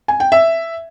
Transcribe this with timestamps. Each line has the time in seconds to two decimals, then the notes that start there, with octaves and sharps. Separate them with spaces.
0.08 G#5
0.20 G5
0.32 E5